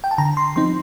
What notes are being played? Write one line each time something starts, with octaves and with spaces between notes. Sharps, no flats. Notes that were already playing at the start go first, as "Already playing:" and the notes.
G5
A5
D3 A#5
C6
F3 C4 D#4 C6